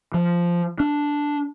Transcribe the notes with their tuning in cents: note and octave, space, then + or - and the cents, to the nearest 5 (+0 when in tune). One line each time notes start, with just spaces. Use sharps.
F3 -10
D4 -5